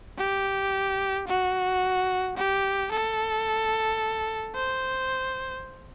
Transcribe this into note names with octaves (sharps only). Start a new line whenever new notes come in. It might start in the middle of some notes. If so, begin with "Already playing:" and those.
G4
F#4
G4
A4
C5